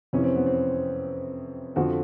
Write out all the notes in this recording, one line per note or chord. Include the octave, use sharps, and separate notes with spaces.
F2 C3 E3 C#4
C4
B3
C4
F2 D3 F3 F#4